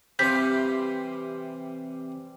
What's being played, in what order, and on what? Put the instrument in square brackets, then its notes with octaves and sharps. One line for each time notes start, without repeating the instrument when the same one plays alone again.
[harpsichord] C3 E3 F5 [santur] G3 C6 [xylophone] G6 B6